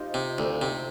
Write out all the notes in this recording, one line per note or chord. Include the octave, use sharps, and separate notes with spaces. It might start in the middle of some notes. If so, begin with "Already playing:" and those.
Already playing: D#4 F4 G4 C5 D#5
C3
D2
C3